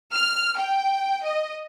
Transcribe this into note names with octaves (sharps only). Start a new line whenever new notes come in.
F6
G5
D#5